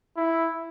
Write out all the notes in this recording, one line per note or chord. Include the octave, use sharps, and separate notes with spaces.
E4